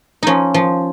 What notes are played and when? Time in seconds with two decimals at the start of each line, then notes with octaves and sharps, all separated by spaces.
0.23 F3 C#4 D#4
0.54 F3